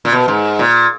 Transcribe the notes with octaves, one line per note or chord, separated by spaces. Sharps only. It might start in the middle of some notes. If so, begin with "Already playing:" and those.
A#2
B2
G#2
A#2